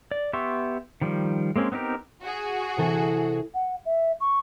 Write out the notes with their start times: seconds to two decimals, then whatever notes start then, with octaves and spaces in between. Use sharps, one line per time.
0.11 D5
0.33 B3 G4 E5 C6 C#6
1.01 D#3 F3 G3
1.56 G#3 A#3 C4 C#4
1.72 B3 C4 D#4 G4 A#4
2.22 F#4 G#4
2.77 C3 E3 A4
3.54 F#5
3.85 E5
4.20 C#6